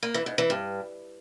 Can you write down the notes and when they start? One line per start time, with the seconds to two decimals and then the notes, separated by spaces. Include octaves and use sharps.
0.03 A#3
0.14 E3
0.26 G#2
0.38 E3
0.50 G2